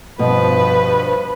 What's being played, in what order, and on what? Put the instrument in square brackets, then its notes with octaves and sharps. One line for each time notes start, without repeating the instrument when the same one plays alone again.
[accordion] G2 F3 [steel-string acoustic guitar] B2 [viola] B4